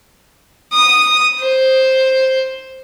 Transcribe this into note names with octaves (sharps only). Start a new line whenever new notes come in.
D#6
C5